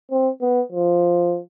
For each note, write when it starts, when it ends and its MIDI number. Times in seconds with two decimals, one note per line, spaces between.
0.11 0.29 60
0.41 0.62 59
0.72 1.39 53